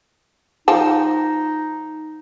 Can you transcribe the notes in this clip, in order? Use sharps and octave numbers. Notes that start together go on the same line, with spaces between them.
F3 D#4 A5